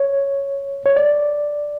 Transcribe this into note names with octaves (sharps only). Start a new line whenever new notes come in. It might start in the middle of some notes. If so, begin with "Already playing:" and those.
Already playing: C#5
C#5
D5